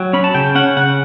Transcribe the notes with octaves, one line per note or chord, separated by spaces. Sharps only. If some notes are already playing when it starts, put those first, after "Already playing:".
Already playing: F#3 G5
C#4 B5
A5
C#3 G5
C#4 F#5
C#3 F#5